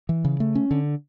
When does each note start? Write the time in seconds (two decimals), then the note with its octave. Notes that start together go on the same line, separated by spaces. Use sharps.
0.09 E3
0.24 C#3
0.40 A3
0.55 C#4
0.71 D3